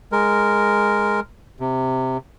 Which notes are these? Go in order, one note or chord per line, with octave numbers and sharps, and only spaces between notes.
G#3 A#4
C3